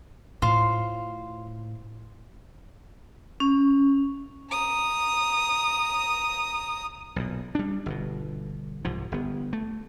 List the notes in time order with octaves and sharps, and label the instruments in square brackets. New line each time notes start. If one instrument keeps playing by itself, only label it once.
[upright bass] A2 [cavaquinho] F4 C5
[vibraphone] C#4
[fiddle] A#5 D#6
[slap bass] B1 A#2
G3 D4
G1 B2
C2 G#2 F3
G1 B3
A3